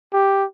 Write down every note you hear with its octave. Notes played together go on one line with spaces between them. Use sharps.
G4